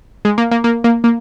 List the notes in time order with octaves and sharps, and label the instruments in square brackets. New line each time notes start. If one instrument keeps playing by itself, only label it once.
[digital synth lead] G#3
A#3
A#3
A#3
A#3
A#3